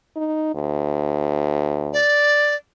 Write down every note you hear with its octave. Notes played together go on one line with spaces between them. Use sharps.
D#4
D2
D5